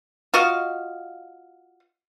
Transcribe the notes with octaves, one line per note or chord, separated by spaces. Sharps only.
F4 F#4 D#5 F5